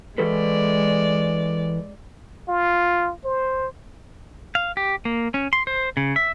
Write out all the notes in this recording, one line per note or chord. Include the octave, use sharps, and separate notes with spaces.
E3 G#3 A4 B4 D5
F4
C5
F5
G4
A#3
C#4
C6
C5
C#3
E5